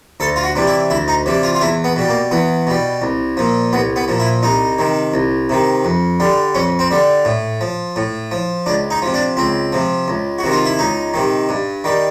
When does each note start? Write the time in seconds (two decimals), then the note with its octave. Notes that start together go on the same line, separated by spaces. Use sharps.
0.20 D2 A4
0.36 F4
0.43 F#4
0.55 C3 E3 G3
0.67 E4
0.90 D2 E4
1.08 D#4
1.26 C3 E3 G3
1.43 F4
1.55 F4
1.61 E2 E4
1.84 B3
1.96 B2 G3
2.09 A#3
2.31 E2 B3
2.67 B2 G3
3.02 C2
3.37 A#2 F3
3.73 C2 B3
3.96 B3
4.08 A#2 F3
4.20 E4
4.43 C2 D#4
4.79 C3 D#3
5.14 C2
5.49 C3 D#3
5.85 F2
6.20 D3 G3
6.55 F2 C#4
6.79 C4
6.91 D3 G3
7.25 A2
7.61 F3
7.96 A2
8.32 F3
8.66 C#2 D4
8.90 D#4
9.02 C3 F3
9.14 D4
9.37 C#2 C4
9.73 C3 F3
10.08 C#2
10.38 F#4
10.44 C3 D#3
10.51 F4
10.65 E4
10.79 C#2 D#4
11.14 C3 D#3
11.49 G2
11.84 D#3 G3